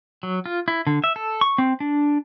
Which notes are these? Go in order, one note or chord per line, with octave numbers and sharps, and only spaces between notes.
F#3
F4
E4
D3
E5
A4
C#6
C4
D4